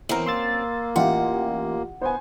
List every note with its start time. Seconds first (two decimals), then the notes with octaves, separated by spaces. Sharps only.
0.09 F#2 E3 B3 C4 A#4
0.26 A#3 C6 E6 A6
0.96 A1 E4 F4 G4 F#5
2.01 B3 C5 G#5